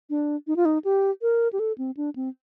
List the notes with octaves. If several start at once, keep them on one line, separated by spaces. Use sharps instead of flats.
D4
D#4
F4
D#4
G4
A#4
G4
A4
C4
D4
C4